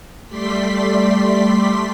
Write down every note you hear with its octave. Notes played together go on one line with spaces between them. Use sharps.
G3 A3 D5 C6 B6